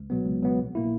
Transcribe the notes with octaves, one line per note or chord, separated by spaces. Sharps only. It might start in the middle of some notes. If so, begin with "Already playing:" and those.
Already playing: C#2
B2 F#3 B3
C#2
B2 F#3 B3
A#1
A#2 A#3 E4